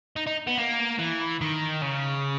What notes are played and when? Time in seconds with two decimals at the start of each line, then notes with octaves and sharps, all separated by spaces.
0.16 D#4
0.27 D#4
0.47 B3
0.58 A#3
0.99 E3
1.41 D#3
1.82 C#3